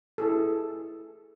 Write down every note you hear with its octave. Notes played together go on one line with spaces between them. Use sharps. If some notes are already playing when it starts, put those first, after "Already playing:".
E4 G#4 A4